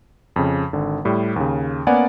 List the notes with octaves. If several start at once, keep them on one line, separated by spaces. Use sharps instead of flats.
F2 C#3
G#1 D3
A2 G3
D#2 C#3
A#3 B3 C#4 D5 F#5 G#5